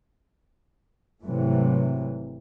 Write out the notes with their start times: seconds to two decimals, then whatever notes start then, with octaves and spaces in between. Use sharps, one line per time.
1.22 G#1 C3 E3 F#3 A3